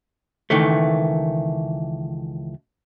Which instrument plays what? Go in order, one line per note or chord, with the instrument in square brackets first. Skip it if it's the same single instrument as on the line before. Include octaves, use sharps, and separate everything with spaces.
[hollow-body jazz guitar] C#2 D#3 E3 A3